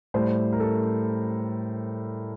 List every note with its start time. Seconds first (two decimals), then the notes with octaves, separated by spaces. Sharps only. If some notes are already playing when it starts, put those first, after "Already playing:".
0.14 A2 G3 C5
0.53 A#4
0.60 A4